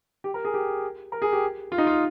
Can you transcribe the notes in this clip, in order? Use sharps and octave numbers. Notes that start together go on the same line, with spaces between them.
G4
A#4
G#4
G4
A#4
G#4
G4
F4
D#4
F4